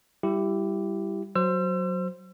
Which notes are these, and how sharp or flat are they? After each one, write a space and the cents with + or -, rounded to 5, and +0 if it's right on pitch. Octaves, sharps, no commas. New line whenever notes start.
G3 +0 E4 +20 G4 -5
F#3 +0 C5 +0 E6 +40